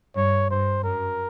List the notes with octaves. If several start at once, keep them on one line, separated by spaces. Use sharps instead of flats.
G2 C#5
G2 C5
F#2 A#4